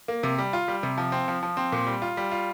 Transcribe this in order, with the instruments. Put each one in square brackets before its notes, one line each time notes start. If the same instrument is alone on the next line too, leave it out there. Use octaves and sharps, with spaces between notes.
[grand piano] A#3
C3
G3
F4
G3
C3
F3
C4
F3
F3
C4
A#2
G3
F4
G3
F4